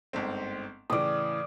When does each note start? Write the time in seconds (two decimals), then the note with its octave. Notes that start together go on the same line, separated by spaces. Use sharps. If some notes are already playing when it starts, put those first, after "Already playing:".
0.13 G1 G#2 C4
0.90 A2 C#3 E3 D5 D#6